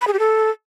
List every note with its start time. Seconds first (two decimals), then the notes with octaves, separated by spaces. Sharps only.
0.01 B5
0.07 G#4
0.13 G4
0.19 A4